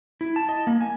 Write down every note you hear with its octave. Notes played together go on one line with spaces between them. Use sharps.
E4
A5
D#5
A#3
G#5